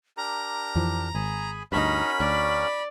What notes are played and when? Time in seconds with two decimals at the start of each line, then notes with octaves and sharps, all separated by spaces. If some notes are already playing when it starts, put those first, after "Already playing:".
0.17 D4 G4 A#4 A#5
0.76 F2 E3 F3
1.15 G#1 G#4 G#5 B5
1.72 D2 G2 C#4 D#4 F#4 A#4 B5
2.20 D2 D5